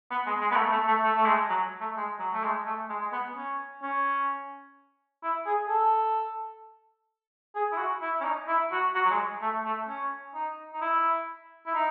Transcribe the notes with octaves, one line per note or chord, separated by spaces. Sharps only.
B3
G#3
G#3
B3
A3
A3
A3
A3
A3
G#3
F#3
A3
G#3
F#3
A3
G#3
A3
G#3
G#3
B3
C#4
C#4
E4
G#4
A4
G#4
E4
F#4
E4
C#4
D#4
E4
F#4
F#4
F#3
G#3
A3
A3
C#4
D#4
D#4
E4
E4
D#4